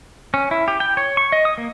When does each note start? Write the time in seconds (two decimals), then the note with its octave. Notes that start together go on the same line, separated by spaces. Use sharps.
0.34 C#4
0.51 E4
0.68 G4
0.80 G5
0.97 C#5
1.17 C#6
1.32 D#5
1.45 D#6
1.58 A#3